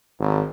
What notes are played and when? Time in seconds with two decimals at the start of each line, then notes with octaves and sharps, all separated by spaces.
0.19 G#1